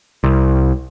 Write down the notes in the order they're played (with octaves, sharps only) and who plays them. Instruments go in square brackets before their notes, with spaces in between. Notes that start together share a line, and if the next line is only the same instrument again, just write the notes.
[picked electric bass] C2